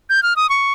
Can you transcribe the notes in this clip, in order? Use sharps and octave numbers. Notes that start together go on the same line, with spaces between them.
G6
F6
D#6
C#6